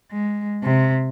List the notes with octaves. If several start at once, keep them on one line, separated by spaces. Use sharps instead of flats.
G#3
C3